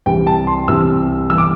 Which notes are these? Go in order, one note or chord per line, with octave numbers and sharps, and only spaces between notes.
C2 C3 E3 G3 G5
A5
C6
C2 C3 E3 G3 E6
G1 G2 E3 G3 E6
D6